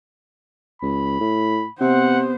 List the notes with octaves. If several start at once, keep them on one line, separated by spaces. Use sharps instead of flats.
C#2 B5
A2
C3 B3 C5 F#5